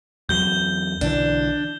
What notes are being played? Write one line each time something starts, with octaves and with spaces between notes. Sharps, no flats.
E2 F#3 G6 G7
B1 D3 E3 D4